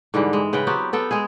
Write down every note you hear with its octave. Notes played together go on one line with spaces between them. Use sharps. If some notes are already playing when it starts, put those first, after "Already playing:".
G#2 D3 E3 G3
G#3
C#3 B4 F#5 G5
F#3 B3 C4 G4
B3 A4 G5
G#3 G#4